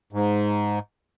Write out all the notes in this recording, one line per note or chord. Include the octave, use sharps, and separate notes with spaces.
G#2